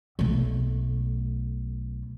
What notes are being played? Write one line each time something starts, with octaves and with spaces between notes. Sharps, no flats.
B1 A3